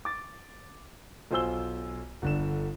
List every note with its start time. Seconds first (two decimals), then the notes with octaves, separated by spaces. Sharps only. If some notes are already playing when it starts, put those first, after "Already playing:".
0.05 D6 A6
1.31 B1 F4 C5 G#5 E6 G7
2.22 G1 D3 E7